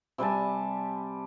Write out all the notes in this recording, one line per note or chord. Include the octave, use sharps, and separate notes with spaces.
C3 G3 G#5 A5